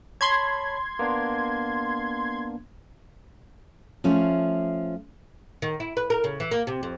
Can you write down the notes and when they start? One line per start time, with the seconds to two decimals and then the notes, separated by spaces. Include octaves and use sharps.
0.21 C#5 A5 B5 C6 G#6
0.99 A#3 B3 D4
4.04 F3 A3 C#4
5.62 D#3
5.80 E4
5.97 B4
6.10 A#4
6.24 C#3
6.40 E3
6.51 A#3
6.67 C3
6.83 F2